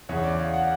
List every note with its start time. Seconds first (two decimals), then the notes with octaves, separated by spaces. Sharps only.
0.09 E2 C#3 E3 C#5
0.24 D5
0.40 F5
0.54 F#5